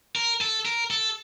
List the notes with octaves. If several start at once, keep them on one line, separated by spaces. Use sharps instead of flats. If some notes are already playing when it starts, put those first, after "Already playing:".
A#4
A4
A#4
A4